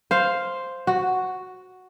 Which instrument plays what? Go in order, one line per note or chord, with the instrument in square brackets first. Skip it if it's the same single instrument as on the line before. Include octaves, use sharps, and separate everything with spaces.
[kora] C5 F5
F#4